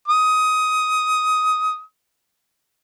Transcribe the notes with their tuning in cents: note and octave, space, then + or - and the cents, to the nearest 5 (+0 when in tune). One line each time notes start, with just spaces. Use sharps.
D#6 +15